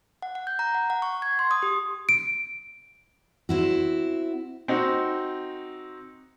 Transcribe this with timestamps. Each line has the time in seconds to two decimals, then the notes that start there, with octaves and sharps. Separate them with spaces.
0.22 F#5
0.35 F#5
0.47 G6
0.59 A#5
0.75 F#5
0.90 F#5
1.02 C#6
1.22 G#6
1.39 C6
1.51 D#6
1.63 G4
2.09 D7
3.49 C4 E4 F#4
4.68 C4 D#4 F#4